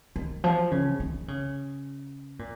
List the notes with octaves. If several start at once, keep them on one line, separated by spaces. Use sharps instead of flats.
D#3
F3
C#3
D#3
C#3
A#2